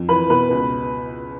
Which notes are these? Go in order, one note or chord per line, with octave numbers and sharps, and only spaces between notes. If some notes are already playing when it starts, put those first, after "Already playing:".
Already playing: F2
E3 B4 B5
B2 B4 B5
C#2